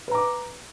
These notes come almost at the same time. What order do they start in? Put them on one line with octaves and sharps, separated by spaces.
B4 A#5 D6